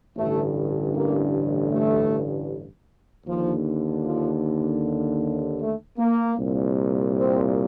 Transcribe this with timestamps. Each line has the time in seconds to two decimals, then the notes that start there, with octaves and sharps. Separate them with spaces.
0.17 A1 G2 D3 A3
0.94 A#3
1.72 A3
3.27 D#2 F3
3.32 D3
4.04 F3
5.61 A3
5.98 A#3
6.38 C2 A#2
7.16 C4